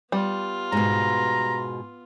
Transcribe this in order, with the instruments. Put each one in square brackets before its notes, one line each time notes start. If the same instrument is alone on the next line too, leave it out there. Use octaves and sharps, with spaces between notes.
[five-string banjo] G3 [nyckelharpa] B3 F4
[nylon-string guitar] G#2 B2 [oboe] A#5